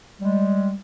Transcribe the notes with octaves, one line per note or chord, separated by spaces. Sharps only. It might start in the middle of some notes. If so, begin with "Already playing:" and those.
G3 G#3